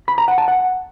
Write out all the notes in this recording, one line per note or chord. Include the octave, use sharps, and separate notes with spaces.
B5
A#5
F#5
A5
F#5